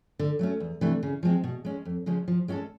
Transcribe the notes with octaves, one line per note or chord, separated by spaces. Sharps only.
D3
F#3 A3 C#4
E2
C3 E3 A3 D4
C#3
F3 G#3 C4
B2
G#3 C#4
F2
C#3 F3 G#3 C#4
F3
G#3 C#4 F#4 A4